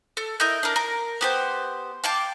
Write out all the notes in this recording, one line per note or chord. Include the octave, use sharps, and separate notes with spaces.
A4
E4 A#4 D#5 G6
D4 A#4
A#4
B3 G4 C5
F5 G5 A5 D6